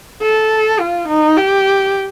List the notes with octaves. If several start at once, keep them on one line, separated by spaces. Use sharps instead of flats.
A4
F4
D#4
G4